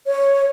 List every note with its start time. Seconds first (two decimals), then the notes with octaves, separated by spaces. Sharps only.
0.07 C#5